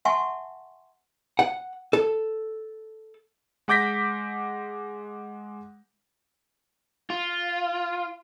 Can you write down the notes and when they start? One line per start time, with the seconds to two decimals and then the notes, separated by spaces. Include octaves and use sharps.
0.05 E5 F#5 G#5 A5 C6 C#6
1.39 F#5
1.93 A4
3.68 G#3 F#5 D6 G6 A#6 B6
7.10 F4